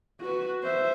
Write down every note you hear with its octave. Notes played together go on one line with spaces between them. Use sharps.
F#4 B4
C5 E5